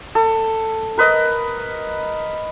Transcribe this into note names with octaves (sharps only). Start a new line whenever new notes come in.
A4
A#4 B4 D#5